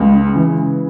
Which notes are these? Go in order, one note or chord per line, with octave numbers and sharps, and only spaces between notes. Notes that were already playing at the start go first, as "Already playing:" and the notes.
Already playing: C#2 C#3 G#3
C#3
E3